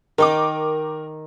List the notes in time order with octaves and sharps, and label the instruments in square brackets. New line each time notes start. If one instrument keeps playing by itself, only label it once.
[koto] D#3 D#4 [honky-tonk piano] A#4 D6